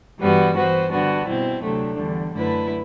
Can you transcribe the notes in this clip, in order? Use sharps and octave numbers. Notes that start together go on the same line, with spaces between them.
G2 E3 G3 B3 F#4
E3 B3 F#4 C5
D3 G3 B3 D4 F#4
B2 G3 C4 E4
D2 C3 F#3 A3 D4
E2 D3 G3
F#2 D3 A3 E4 B4